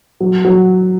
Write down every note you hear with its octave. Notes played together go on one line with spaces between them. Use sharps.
F#3
F#3